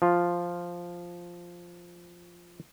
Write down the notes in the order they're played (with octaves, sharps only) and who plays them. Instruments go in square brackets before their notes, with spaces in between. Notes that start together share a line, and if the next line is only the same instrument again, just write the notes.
[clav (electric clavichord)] F3 F4